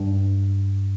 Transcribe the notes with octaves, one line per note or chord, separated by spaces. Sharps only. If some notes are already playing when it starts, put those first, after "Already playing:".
Already playing: G2